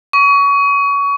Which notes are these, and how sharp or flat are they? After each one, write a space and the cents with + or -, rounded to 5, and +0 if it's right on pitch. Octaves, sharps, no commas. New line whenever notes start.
C#6 +25